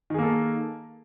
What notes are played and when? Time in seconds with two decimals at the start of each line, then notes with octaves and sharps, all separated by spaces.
0.10 D#3
0.14 G#4
0.19 A#3
0.23 A4